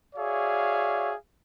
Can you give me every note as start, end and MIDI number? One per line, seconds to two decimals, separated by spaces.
0.15 1.14 66
0.15 1.14 68
0.15 1.14 73
0.15 1.14 74
0.15 1.14 76
0.15 1.14 77